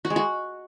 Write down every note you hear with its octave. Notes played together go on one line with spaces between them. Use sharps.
F#4
G#3
F#4